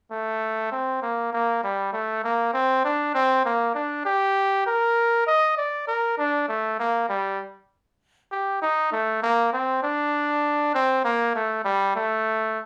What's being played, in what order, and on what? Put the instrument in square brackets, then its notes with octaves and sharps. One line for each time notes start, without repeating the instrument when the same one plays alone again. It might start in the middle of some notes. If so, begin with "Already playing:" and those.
[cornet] A3
C4
A#3
A#3
G3
A3
A#3
C4
D4
C4
A#3
D4
G4
A#4
D#5
D5
A#4
D4
A3
A#3
G3
G4
D#4
A3
A#3
C4
D4
C4
A#3
A3
G3
A3